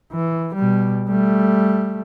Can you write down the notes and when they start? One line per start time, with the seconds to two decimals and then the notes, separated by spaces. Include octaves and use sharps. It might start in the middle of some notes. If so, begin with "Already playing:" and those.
0.13 E3
0.55 B2 G3
1.08 G3 A3